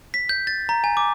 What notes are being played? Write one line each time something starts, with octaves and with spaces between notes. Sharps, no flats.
B6
G6
A6
A#5
G#5
D6